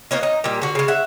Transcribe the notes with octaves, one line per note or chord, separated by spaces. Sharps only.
A#3 B3 C#5 D#5
D#4
A#2 G3
D3 F#4
C#3 G#3
E5 F#5